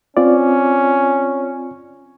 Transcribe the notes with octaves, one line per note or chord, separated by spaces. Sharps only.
C4 C#4 F4 D5